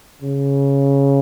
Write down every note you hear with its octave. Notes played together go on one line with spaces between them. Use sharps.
C#3